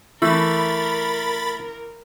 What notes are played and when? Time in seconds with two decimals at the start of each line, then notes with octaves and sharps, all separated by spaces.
0.22 E3 A3 A#4 B5 A6